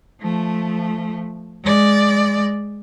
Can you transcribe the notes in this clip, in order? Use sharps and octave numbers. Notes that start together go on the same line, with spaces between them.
F3 A3
G#3 D5